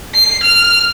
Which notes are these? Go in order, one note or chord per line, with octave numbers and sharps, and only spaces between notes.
C7
F6